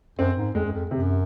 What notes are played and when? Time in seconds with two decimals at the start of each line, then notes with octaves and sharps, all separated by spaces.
0.19 F#2 C4
0.37 G#2
0.55 F2 G#3
0.66 F#2
0.73 F2
0.91 F#2 C3